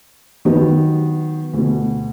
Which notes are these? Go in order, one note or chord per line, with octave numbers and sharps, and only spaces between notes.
D#3 F#3 B3
D2 B2